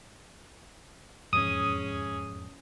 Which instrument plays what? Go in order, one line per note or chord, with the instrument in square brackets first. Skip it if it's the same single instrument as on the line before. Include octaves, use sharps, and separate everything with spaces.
[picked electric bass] E1 F2 G#2 [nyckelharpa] C#4 G#4 [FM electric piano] D#6